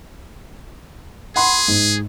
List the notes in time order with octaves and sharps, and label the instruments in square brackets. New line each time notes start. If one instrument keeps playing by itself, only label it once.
[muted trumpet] G#4 [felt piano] F#5 B5 C6
[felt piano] G#2